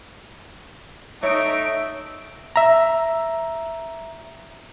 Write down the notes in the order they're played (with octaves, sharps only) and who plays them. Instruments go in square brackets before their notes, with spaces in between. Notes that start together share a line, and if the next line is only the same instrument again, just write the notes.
[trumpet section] A3 D#4 [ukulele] C#5 [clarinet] E5 [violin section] D7
[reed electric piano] E5 A#5